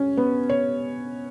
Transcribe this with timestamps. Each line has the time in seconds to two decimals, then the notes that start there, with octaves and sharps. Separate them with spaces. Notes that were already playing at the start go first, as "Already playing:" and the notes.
Already playing: C#4
0.17 B3
0.50 C#5